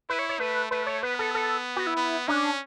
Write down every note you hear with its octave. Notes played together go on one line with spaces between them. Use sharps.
E4 B4
C#5
C#5
A3 B4
A3 B4
C#5
B3 B4
A4
A4
F#4
E4
B3
C#4 D4